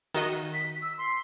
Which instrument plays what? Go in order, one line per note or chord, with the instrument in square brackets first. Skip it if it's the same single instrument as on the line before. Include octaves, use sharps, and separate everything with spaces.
[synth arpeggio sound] D#3 F#4 D#5
[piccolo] B6
E6
C6